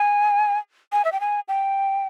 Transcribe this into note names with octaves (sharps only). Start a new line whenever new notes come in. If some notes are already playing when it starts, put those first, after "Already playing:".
Already playing: G#5
G#5
E5
G5
G#5
G5